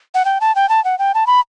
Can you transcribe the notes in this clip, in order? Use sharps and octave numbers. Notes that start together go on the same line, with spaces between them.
F#5
G5
A5
G5
A5
F#5
G5
A5
B5